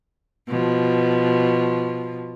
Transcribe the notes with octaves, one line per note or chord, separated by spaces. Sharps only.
B2 F3